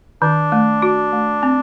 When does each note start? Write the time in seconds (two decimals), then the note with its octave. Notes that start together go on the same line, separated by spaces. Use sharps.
0.22 D#3 D4
0.52 A3
0.82 F#4
1.13 A3
1.43 C4